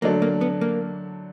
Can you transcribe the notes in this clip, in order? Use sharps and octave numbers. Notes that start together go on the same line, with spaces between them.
D3 F#3 A3 A#3 D4
A#3
B3
A#3